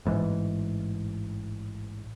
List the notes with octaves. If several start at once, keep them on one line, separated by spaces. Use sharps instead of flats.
A1 G#2 E3